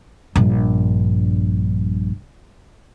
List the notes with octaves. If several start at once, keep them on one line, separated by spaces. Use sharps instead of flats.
A#1 G2